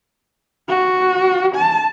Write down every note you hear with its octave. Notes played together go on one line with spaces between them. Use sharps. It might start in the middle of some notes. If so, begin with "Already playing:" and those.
F#4
A5